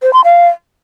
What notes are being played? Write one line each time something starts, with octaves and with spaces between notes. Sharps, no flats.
C5
C6
F5